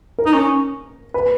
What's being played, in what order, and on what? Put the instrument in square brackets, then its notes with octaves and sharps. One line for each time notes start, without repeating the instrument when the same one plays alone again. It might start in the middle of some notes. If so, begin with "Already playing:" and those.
[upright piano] A#4
[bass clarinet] D#4
C#4
[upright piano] B4